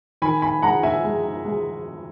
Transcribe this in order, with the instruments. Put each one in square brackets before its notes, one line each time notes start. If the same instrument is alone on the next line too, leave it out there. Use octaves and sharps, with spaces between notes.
[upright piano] D#3 G#5 B5
G#5 B5
G#3 F#5 A#5
E5 G#5
G#3
G#3